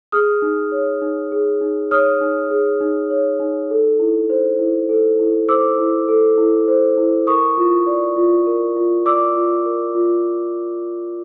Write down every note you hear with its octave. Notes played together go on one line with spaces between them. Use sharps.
G#4 D#6 F6
D#4
C#5
D#4
G#4
D#4
C#5 D#6 F6
D#4
G#4
D#4
C#5
D#4
A4
E4
C5
E4
A4
E4
C5 D6 E6
E4
A4
E4
C5
E4
A#4 C#6 D#6
F4
D5
F4
A#4
F4
D5 D6 E6
F4
A#4
F4